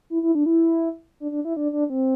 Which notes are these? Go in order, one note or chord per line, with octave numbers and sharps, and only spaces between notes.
E4
E4
D4
E4
D4
D4
E4
D4
D4
C4